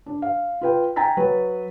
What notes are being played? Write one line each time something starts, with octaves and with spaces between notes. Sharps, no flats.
D4
F5
F4 B4 G5
G5 G#5 A#5 A6 B6
F#3 B4